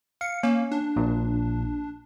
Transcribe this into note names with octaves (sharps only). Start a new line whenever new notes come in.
F5 C#7
A#3 C#4
D4
A#1 A#2